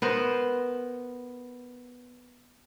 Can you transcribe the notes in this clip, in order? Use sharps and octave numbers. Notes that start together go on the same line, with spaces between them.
B3 A#4 C5